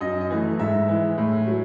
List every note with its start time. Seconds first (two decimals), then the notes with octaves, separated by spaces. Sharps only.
0.01 F#2 D#5
0.21 D#5
0.30 E3 A3
0.59 G#2 E5
0.88 E3 G#3
1.18 A2
1.47 F#3